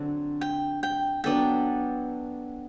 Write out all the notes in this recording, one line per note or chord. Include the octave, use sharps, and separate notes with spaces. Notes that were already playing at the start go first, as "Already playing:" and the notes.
Already playing: D3 F#3 C4
G5
G5
F#3 B3 D4 A4 G5